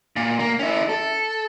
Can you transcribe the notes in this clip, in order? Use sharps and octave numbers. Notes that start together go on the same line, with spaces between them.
A#2
A#3
C#4 E4
A4